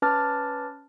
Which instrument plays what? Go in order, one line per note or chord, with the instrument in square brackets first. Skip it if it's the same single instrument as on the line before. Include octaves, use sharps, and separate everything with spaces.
[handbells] C#4 B4 A5 D6 F6 A6